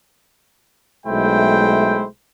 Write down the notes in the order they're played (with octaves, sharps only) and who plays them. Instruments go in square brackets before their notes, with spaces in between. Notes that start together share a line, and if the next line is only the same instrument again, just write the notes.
[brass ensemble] B1 G#3 A3 E4 C5 G5